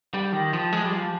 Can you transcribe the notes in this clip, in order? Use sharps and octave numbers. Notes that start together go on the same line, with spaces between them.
G3
D#3
F3
G#3
G3
F3